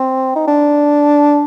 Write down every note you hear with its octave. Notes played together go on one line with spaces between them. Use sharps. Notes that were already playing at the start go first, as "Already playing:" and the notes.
Already playing: C4
D#4
D4